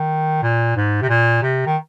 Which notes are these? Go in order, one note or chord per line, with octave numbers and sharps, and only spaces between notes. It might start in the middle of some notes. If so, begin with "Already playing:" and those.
Already playing: D#3
A#2
G#2
C3
A#2
C3
D#3